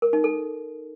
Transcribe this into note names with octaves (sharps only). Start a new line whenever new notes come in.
A#4
D#4
A4